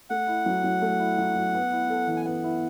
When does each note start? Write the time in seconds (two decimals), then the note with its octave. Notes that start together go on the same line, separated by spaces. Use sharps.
0.10 A3 F#5
0.27 E4
0.46 F#3
0.64 F#3
0.82 A3
1.00 E4
1.18 F#3
1.36 F#3
1.54 B3
1.72 E4
1.90 A4
2.07 E3
2.17 G#5
2.25 B3 F#5
2.44 E4